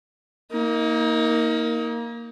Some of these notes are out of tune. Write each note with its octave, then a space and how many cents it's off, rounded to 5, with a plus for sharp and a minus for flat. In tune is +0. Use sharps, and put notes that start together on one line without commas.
A#3 +0 D#4 +30